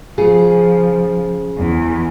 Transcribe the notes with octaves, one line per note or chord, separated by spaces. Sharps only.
C#3 F3 F4 G#4
E2